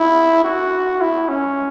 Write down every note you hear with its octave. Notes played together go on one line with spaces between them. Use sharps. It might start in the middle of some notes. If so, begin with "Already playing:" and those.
Already playing: E4
F#4
E4
C#4